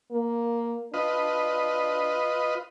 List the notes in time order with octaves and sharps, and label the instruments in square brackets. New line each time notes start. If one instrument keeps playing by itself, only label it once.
[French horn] A#3
[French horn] D4 [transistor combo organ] F4 B4 D#5